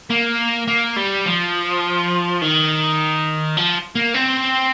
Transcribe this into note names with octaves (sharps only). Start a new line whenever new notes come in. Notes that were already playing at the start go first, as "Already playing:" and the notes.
A#3
A#3
G3
F3
D#3
F3
A#3
C4